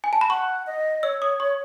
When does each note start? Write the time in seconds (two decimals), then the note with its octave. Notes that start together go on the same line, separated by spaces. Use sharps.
0.04 G#5
0.13 A5
0.21 B5
0.30 F#5 C#6
0.67 D#5
1.03 C#5 E6
1.22 D#6
1.40 C#6